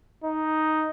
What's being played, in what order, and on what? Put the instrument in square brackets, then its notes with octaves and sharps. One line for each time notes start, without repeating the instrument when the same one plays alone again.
[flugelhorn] D#4